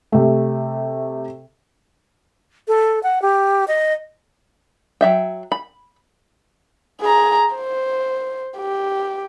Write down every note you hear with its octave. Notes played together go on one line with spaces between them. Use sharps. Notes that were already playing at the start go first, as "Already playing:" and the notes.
C3 A3
A4
F#5
G4
D#5
F#3 E5 G5
B5
G#4 A#5
C5
G4